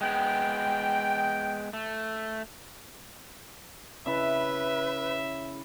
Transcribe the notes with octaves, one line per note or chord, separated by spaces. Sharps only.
G#3 B3 G5
A3
C#3 E4 B4 E5